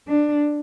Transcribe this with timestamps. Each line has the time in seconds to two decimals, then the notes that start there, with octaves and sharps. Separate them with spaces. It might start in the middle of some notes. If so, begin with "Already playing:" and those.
0.08 D4